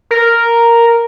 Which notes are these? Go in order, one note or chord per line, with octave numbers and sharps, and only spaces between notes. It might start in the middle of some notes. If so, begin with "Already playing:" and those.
A#4